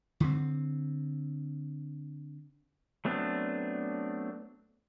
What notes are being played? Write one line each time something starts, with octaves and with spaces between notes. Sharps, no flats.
D3 C4
F#3 A3 B3 C4 D4